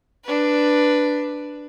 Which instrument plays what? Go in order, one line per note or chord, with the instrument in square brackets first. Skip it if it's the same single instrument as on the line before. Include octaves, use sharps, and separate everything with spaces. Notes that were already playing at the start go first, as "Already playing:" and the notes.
[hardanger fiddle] D4 B4